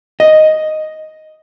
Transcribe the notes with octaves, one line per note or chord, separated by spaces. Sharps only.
D#5